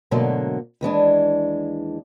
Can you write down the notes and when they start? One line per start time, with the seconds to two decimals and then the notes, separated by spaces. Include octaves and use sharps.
0.11 G#2 B2 D3 F#3 A3 A#3
0.81 D#2 E3 G#3 D4